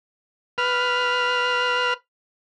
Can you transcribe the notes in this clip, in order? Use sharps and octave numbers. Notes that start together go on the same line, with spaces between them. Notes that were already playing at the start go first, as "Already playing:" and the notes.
B4 F6